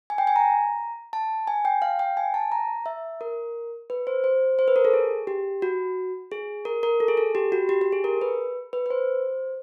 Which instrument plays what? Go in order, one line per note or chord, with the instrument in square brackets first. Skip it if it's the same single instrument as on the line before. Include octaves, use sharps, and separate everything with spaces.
[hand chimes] G#5
G5
G#5
A#5
A5
G#5
G5
F5
G5
G#5
A5
A#5
E5
A#4
B4
C5
C5
C5
B4
A#4
A4
G#4
G4
F#4
G#4
A#4
A#4
A4
G#4
A4
G4
F#4
G4
G4
G#4
A#4
B4
B4
B4
C5